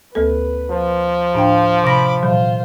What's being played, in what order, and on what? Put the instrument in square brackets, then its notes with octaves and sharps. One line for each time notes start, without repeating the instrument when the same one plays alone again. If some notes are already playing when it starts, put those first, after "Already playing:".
[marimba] D2 A#3 A4 [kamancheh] B4
[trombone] F3
[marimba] A2 D4 G5 [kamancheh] F5
[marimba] C3 A#6 [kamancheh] B5 D6
[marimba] A#2 E3 F#3 [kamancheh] F4 C5